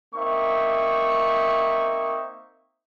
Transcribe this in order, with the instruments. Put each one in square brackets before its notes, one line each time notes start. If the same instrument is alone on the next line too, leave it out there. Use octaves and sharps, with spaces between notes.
[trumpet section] A#3 C4 D#4 E5 C#6